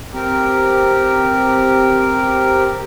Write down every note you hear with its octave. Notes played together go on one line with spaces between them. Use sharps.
C4 G4 A#4